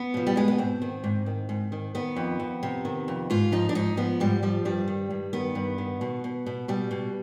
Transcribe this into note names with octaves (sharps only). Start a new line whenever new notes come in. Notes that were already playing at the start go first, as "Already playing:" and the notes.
Already playing: B3
B2 F3
G3
B2 G#3
B3
G#2 C4
D#3
G#2
D#3
G#2
D#3
D#3 B3
F2
F2
C3
D#3
F2
G#2 F4
F3 D#4
D4
G#2 D#4
F3 B3
G#2 G3
F3 G3
G2 G3
D#3
G2
D#3 B3
G2
D#3
B2
B2
B2
B2 G3
B2